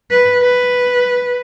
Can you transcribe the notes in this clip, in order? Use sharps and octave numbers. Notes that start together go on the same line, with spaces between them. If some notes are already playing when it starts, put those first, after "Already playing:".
B4
B4